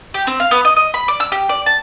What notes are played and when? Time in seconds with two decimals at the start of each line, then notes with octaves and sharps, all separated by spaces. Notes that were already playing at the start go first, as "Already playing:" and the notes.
0.14 G4
0.27 C4
0.40 F5
0.51 B3
0.65 D#5
0.76 D#5
0.94 B5
1.08 D5
1.20 E6
1.32 G4
1.49 D5
1.66 A5